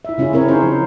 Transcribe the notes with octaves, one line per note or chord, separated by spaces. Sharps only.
E4 E5
C#3 C#4 E4 F4 G#4
C4 C#4 E4 A#4 C#5
C#4 D#4 C5
F3